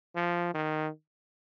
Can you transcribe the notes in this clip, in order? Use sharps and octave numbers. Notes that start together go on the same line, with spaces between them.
F3
D#3